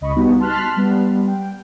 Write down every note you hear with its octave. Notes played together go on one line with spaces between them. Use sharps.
C#2 D#5 B5 C#6
G3 B3 D#4 F#4
A5 C6 F6 F#6 B6
G3 B3
G5